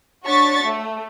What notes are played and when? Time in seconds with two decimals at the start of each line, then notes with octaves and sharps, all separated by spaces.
0.24 D4 F#4 C#5 C#6 A6 B6
0.64 A3